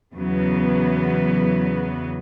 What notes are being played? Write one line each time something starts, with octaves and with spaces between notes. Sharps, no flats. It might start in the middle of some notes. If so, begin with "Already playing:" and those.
E2 C#3 F#3 B3